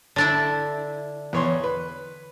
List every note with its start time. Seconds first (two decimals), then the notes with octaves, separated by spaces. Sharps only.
0.16 D3 D4 E4
1.33 E2 C#5 C6
1.64 B4